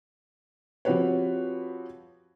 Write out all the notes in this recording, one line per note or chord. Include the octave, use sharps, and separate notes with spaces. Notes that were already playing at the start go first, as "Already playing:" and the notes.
F3 C4 F#4 G4 B4 C#5